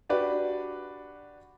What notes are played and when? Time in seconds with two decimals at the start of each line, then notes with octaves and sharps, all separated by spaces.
0.09 D4 F#4 G4 B4 D5